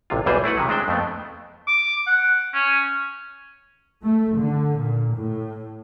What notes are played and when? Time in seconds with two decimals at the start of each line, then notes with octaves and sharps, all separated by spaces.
0.10 A1 C3 F4
0.26 B1 E2 E3 G3 G#4 C5
0.44 A3 E4 B4 F#5
0.57 C3 D#3 F#3
0.69 G#3 D4 C5 G5
0.88 F2 A3 B3
1.68 D6
2.07 F#5
2.54 C#4
4.04 A3
4.37 D3
4.78 A#2
5.14 A2